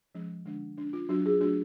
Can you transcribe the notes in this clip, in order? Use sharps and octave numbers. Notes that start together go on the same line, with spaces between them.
F3 G#3 C#4
D3 G#3 D4
G#3 C#4 D4
F4
F#3 C#4 D4 F#4
F4 G#4
F#3 A3 D4 F#4